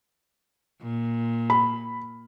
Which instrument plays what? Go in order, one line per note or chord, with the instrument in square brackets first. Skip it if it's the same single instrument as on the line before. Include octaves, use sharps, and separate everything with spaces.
[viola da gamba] A#2
[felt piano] B5